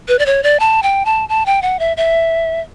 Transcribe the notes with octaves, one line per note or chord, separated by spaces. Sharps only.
B4
D5
C#5
D5
A5
G5
A5
A5
G5
F#5
E5
E5